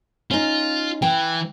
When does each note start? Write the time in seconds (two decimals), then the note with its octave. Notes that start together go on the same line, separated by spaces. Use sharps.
0.31 C#4 D#4 F4
1.02 E3 G5